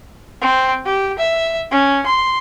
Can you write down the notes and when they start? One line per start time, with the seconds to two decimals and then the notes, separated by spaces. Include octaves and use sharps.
0.42 C4
0.85 G4
1.19 E5
1.71 C#4
2.06 C6